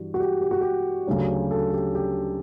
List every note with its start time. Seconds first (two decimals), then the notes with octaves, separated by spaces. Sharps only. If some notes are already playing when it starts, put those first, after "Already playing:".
Already playing: G2 E3 G3 F#4
0.14 F#4
0.20 G4
0.41 G4
0.51 F#4
0.61 G4
1.07 D2 C#3 F#3 C#4
1.51 A4
1.73 G4
1.95 G4